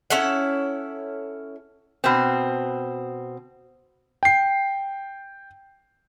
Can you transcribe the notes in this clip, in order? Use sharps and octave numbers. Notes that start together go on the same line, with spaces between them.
C#4 E4 A4 F#5
B2 C4
G5 C7